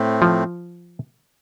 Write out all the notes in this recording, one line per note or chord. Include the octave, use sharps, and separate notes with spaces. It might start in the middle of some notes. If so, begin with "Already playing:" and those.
Already playing: A2 A3 C4
F3